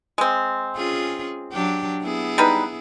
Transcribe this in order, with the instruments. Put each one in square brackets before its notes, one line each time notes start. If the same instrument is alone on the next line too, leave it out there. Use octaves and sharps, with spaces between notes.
[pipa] G#3 C4
[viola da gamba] C#4 F4 G#4
F#3 D4 G4
B3 E4 G#4
[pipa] G3 D#4 B4